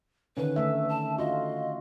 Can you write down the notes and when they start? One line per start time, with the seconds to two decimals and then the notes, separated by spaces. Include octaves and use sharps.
0.37 D3 D#3 C#4 B4
0.56 D3 A3 E5
0.89 A5
1.18 F4 F#4 D#5